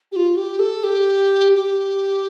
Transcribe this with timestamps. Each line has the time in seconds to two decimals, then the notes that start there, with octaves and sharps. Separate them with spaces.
0.12 G4
0.16 F4
0.36 G4
0.59 A4
0.84 G4
1.55 G4